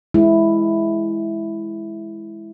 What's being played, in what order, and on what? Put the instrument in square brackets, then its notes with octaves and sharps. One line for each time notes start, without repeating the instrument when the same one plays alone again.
[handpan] G#3 E4